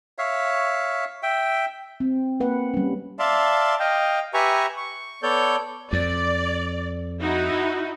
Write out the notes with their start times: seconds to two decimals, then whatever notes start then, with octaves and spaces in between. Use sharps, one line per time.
0.18 C#5 E5 F5
1.23 E5 G5
2.00 C4
2.40 A#3 B4 F#5
2.74 G3 C#4
3.19 D5 E5 F5 A5 C6
3.80 D#5 F5 G5
4.34 G4 B4 E5 G#5 A#5 C#6
4.77 C#6
5.23 B3 A4 C#5 D5 G6
5.93 F2 D5
7.21 D#4 E4 F#4